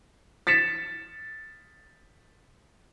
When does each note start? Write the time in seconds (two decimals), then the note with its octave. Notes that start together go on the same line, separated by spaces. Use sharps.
0.47 A6 B6 C#7 E7